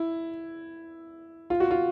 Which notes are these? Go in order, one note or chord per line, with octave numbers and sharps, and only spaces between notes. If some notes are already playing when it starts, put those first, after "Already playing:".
Already playing: E4
F4
F#4
F4